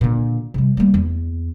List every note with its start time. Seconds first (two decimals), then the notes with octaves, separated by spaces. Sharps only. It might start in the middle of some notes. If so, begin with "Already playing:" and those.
0.01 A#2 D3
0.54 C3 G3
0.77 G3 A#3
0.94 E2